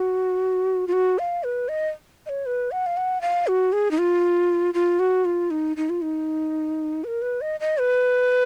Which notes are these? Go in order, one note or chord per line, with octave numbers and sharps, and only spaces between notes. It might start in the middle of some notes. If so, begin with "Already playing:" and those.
Already playing: F#4
F4
F#4
F5
B4
D#5
D#5
C#5
B4
F#5
F5
F#5
F5
F#4
G#4
D#4
F4
F4
F#4
F4
D#4
D#4
F4
D#4
B4
A#4
B4
D#5
D#5
B4